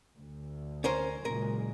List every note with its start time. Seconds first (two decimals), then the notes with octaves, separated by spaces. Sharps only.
0.16 D2
0.84 C#4 A#4 C5
1.25 F#1 A#2 G#3 A#4